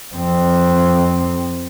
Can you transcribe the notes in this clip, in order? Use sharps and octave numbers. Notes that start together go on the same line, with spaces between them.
F2 C4